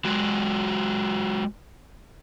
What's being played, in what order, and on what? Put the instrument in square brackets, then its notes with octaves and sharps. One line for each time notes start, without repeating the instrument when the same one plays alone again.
[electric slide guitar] F#3 G#3 F#4